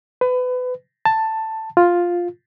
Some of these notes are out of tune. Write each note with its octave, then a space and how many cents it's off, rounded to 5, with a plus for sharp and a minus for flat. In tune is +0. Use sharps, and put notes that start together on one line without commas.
B4 +25
A5 +10
F4 +5